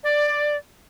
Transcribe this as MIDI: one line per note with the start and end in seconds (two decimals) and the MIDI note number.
0.04 0.56 74